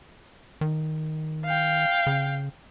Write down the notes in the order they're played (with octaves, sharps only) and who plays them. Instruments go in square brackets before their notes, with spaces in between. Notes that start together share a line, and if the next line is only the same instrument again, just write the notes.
[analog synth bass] D#3
[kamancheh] F5 G5
[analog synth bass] C#3